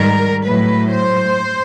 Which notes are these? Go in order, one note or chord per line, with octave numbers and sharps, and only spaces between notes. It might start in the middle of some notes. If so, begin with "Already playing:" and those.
Already playing: G#2 D#3 G3 A#4
A2 F#3 B4
C5